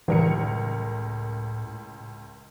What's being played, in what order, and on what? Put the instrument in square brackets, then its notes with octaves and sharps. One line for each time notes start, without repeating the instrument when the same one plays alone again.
[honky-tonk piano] C#2 A#4 C#7 [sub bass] A2 [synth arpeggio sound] D#3 E3 G3